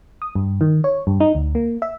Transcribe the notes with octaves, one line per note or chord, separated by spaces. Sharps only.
D#6
G2
D#3
C#5
G2
D#4
D2
A#3
E5